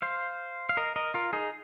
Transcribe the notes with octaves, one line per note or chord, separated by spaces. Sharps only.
C5 F5
F5
A#4 D#5
A#4 D#5
F4 A#4
D#4 G#4